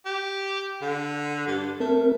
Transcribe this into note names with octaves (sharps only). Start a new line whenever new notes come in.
G4
D3
G2
A3 C4 A#4